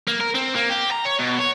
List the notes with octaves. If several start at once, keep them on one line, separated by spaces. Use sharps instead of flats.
A#3
A#4
C4
A#3
G4
A#5
C#5
B2
C#5